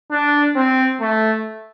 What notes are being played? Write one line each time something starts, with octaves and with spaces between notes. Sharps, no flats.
D4
C4
A3